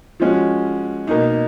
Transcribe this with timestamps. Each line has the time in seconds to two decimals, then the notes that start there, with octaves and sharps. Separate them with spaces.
0.20 F3 G#3 C#4 F#4
1.07 B2 A#3 D#4